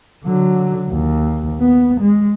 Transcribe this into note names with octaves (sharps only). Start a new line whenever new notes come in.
D3 F#3
D#2
B3
G#3